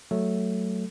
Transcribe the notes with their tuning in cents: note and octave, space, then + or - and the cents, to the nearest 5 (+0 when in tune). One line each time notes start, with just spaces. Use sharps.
F#3 +10 A3 +0 A4 +0